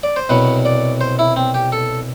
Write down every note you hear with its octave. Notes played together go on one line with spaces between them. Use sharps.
D5
C5
C2 B2 F#3 B4
D5
C5
E4
C4
G4
A4